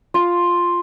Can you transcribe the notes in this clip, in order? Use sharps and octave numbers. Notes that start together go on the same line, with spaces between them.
F4